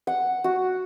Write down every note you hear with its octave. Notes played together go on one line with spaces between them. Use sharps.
F#5
F#4